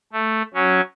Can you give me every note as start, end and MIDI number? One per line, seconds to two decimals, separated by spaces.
0.12 0.42 57
0.54 0.81 54
0.54 0.81 61